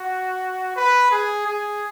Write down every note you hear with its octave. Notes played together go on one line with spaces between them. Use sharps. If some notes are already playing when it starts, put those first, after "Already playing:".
Already playing: F#4
B4
G#4
G#4